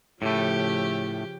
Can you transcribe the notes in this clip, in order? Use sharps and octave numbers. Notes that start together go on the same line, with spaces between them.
A2 C#3 F3 A3 G4